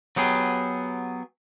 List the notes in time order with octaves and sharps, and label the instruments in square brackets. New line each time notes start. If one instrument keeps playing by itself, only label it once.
[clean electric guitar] F#3 B3 G4 G#4